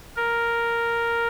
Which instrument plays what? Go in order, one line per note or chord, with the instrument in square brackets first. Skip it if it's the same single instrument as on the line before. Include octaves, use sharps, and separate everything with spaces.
[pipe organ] A#4